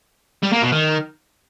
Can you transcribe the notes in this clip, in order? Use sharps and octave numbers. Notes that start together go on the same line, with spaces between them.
G3
A#3
B2
D#3